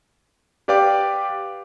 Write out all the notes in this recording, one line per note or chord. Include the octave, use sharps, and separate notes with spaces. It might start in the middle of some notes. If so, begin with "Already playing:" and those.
G4 B4 D5 F5 G5 D6